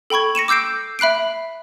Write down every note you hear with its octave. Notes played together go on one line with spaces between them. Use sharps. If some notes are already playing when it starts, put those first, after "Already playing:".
A4 G5 B5 C#6 G#6
A#6 C#7 D#7 E7
D6 E6 G6 C7 D7
E5 B5 F#6 C7 D7